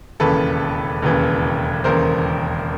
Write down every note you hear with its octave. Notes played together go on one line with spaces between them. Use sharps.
E1 D#2 C#3 E3 A4 B4
E1 D#2 C#3 E3
E1 D#2 C#3 E3 A#4 C5